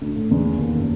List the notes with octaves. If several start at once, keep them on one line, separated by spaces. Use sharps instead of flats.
D2
A2
E2
D#2
F#1